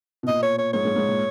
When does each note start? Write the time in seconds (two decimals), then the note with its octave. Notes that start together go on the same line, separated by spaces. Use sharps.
0.23 B2
0.27 A#2 D#5
0.43 C#5
0.58 C#5
0.73 G#2 C#5
0.85 G#2
0.96 G#2
1.08 A#2